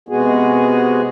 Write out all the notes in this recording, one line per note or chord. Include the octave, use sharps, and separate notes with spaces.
C3 G#3 B3 F#4 G#4